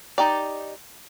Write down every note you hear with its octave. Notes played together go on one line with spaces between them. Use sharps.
D#4 G4 D5